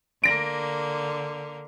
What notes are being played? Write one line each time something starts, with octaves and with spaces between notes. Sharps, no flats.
D3 A#3 A#6 D7